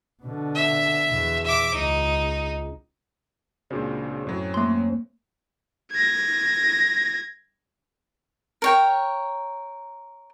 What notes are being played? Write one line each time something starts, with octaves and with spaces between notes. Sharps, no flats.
B2 D3
E5
E2 B2
E5 D6
C#2 D#4
C#2 A#2 C#3 C4 D4 F#4
F#2 A2 F#3 C4 C#4
A3 A#3 C6
G#6 A#6
A#4 C#5 G5